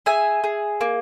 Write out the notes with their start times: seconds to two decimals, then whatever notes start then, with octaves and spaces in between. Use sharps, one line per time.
0.06 G#4 E5 G#5
0.44 G#4
0.81 A#3